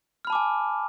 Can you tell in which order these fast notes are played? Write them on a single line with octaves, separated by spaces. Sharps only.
F6 B5 A5 D6 G#5